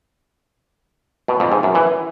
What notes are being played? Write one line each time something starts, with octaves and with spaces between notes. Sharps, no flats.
B2
F2
G#2
F#2
E3